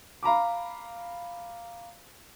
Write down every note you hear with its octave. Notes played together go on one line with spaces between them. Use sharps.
F5 A#5 B5 D6